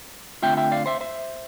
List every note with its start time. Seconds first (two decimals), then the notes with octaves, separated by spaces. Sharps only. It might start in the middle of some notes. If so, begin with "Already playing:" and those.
0.42 D3 A3 C4 F4 E5 G5
0.57 E5 G5
0.72 D5 F5
0.86 C5 E5
1.01 C5 E5